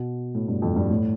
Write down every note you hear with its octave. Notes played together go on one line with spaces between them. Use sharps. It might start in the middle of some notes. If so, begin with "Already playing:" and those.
Already playing: B2
A2
G2
F2
G2
A2